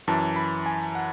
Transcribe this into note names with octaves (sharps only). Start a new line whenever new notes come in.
F#2 E3 A5
B5
G#5
F#5